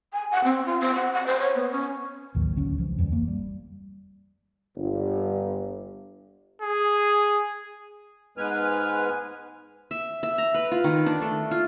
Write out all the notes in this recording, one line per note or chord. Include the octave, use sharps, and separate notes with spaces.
G#5
F#5
C4
F4
C4
F#5
F#5
C5
C#5
B3
C#4
A1 D#2 D#3 F#3
D2 D3 C#4
C#2 E3 F3
F2 E3 F#3 G3
G1 A#3
G3
G1
G#4
G#2 G#3 B3 B4 G#5 F6
E5
E5
A#5
B4
F4
D#3
D4
A3
F4